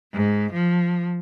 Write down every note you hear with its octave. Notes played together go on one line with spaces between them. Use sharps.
G#2
F3